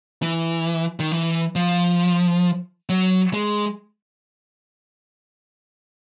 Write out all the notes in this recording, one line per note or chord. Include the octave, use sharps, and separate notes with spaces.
E3
D#3
E3
F3
F#3
G#3